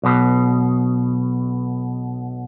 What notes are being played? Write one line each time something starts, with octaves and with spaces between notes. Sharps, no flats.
B1 B2